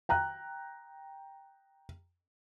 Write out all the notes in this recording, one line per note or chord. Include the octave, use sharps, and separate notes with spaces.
G5 A#5 F#6